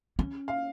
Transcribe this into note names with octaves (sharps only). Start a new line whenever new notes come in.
C#4
F5